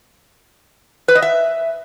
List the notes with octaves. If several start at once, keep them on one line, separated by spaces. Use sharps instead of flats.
B4
D#5
E5